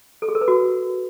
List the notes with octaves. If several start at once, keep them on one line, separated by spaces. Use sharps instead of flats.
A4
G#4
A#4
B4
F#4